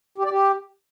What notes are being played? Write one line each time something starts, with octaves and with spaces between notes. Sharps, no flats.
G4
D5
G4